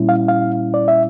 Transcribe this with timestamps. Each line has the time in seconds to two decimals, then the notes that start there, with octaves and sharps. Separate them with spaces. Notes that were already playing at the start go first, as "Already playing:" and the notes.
Already playing: A#2 G3 C#4 E4
0.09 F5
0.28 F5
0.74 D5
0.88 E5